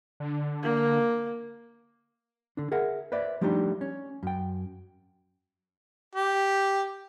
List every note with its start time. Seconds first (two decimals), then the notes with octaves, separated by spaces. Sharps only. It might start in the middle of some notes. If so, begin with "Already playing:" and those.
0.20 D3
0.63 A#3
2.57 D3 D4
2.72 G#4 A#4 E5 F#5
3.12 B4 C5 D5 E5
3.41 F3 G3 A3 D4 D#4 G4
3.81 C#4
4.23 F#2 G5
6.15 G4